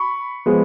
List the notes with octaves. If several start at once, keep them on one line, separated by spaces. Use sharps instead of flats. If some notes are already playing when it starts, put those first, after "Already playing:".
Already playing: B5 C#6
F3 G#3 B3